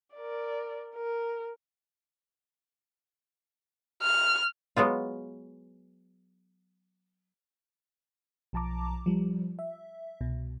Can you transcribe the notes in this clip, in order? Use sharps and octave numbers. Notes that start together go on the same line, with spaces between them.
A#4 D5
A#4
F6
F#3 G#3 B3 F4
B1 F3 A5 A#5 D6
F3 G3
E5
C2 B2